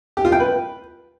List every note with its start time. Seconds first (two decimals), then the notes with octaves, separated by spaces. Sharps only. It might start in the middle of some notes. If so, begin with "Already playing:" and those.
0.17 G4
0.25 F4
0.32 G5
0.40 B4